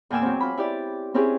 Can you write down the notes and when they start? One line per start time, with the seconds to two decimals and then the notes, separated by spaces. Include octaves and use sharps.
0.10 E2 A#2 G5 G#5 D6 E6
0.22 F#3 C4
0.40 F4 B5
0.57 E4 G4 D5
1.14 C4 C#4 E4 G4 G#4